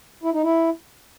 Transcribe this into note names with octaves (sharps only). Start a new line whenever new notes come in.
E4
D#4
E4